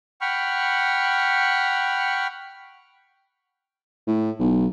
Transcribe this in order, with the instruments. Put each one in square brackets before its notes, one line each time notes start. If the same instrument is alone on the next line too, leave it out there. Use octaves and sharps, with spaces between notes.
[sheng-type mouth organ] F#5 G5 B5 C#6 F6
[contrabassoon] A2
B1